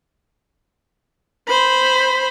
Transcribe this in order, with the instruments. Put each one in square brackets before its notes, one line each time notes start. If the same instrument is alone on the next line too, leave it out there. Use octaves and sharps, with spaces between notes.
[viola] C5 B5